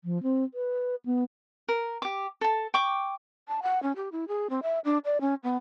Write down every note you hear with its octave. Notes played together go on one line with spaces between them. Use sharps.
F3
C4
B4
B3
A#4
G4 D6
A4 A5
G5 C#6 D6
A5
F#5
C#4
G4
E4
G#4
C4
E5
D4
D5
C#4
B3